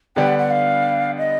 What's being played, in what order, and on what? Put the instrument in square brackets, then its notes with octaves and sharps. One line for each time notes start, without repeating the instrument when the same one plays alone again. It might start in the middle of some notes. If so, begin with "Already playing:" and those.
[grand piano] D3 G3 B3 D4 G4 [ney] G5
[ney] F#5
F#5
F5
D#5